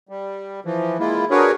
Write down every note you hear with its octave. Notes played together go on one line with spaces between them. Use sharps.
G3
E3 F3
G#3 A#3 E4 F4
D4 F#4 G#4 A#4 B4 C#5